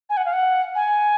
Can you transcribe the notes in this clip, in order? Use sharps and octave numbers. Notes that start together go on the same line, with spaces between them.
G#5
F#5
F5
F#5
G#5